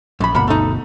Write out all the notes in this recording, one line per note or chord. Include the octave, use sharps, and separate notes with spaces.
A#1 F#2 B5
G1 B2 A#3 F#5 B5
A3 D#4